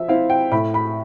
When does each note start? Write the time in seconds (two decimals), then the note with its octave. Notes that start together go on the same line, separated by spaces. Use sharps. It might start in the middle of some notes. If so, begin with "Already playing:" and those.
Already playing: F3 E5
0.08 C4 E4 F5
0.30 G5
0.51 A2 B5
0.74 B5